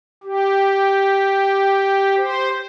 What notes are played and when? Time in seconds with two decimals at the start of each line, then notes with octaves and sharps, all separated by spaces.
0.24 G4
2.18 C5